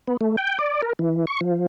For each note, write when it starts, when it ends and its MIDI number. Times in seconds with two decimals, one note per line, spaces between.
0.08 0.17 59
0.21 0.36 57
0.37 0.58 79
0.59 0.81 74
0.82 0.93 70
0.99 1.25 52
1.27 1.41 85
1.41 1.66 53